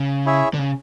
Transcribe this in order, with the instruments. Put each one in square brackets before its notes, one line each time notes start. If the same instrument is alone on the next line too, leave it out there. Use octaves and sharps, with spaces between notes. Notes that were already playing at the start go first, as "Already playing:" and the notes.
Already playing: [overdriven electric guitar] C#3
[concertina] E4 G#4 C#5 E5
[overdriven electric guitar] D3
C#3